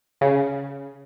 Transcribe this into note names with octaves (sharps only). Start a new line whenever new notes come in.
C#3